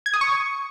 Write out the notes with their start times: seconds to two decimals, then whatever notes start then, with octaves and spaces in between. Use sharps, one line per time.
0.06 G#6
0.13 D#6
0.21 C#6